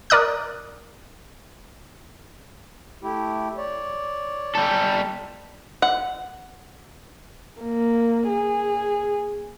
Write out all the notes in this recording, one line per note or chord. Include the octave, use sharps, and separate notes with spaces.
A#4 D5 D#6 F#6
A3 E4 G4
C#5 D5
G3 A4
F#5
A#3
G#4